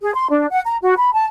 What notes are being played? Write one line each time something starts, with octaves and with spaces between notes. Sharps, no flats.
G#4
C6
D4
F#5
A#5
F#4
B5
A5